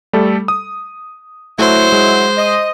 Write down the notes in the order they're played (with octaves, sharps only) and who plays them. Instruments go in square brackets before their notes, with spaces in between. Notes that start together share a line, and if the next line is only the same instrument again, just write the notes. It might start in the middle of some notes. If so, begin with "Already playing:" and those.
[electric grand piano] G3 A3 A4
D#6
[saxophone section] F#3 E4 [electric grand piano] A3 [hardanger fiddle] C5
[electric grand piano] G#3
[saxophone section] D#5